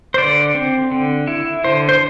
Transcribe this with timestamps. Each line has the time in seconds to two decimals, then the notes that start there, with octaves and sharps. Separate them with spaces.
0.14 C5
0.18 D3 D5
0.55 C4
0.92 D3
1.27 E4
1.64 D3 C5
1.89 C5